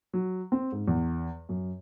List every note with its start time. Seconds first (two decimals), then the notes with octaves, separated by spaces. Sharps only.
0.14 F#3
0.52 C4
0.72 G#2
0.88 E2
1.49 F#2